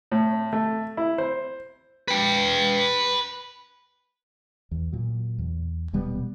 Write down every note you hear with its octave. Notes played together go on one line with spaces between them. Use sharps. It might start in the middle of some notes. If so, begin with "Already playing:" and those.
A2
A3
E4
C5
B4 G5
E2
A#2 F#3
E2
D#1 B2 G3 B3